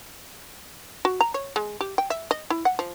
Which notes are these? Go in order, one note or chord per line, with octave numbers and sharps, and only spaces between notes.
F#4
A#5
C#5
G#3
G4
G5
E5
D#5
E4
F#5
F3